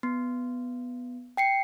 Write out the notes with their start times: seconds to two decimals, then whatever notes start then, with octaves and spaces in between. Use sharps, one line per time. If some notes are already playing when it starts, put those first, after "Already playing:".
0.03 B3
1.37 G5 C7 C#7